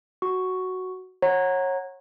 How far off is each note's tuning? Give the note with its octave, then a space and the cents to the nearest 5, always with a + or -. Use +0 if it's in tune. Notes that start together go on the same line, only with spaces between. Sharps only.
F#4 +5 C#6 +0
C#5 -25 F#5 +0 A#5 +0